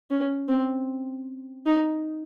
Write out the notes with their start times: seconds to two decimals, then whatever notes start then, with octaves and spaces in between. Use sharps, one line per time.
0.10 C#4
0.48 C4
1.66 D#4